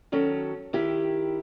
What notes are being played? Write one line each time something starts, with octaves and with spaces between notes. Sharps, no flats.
D#3 F#3 C#4 A4
D#3 E4 G4